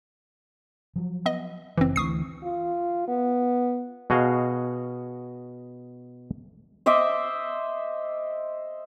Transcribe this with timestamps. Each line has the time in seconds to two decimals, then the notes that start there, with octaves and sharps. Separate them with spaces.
0.96 F3 F#3
1.26 B3 D#5
1.78 F#1 E3 C4
1.96 D2 D3 E3 C#6 D#6 C7
2.43 F4
3.08 B3
4.10 B2 F#4 G#4 D#5 F5
6.86 C5 D#5 E5 D6